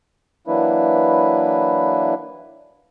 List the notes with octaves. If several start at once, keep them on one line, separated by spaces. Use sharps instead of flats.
E3 F#3 A#3 D4 E4 B4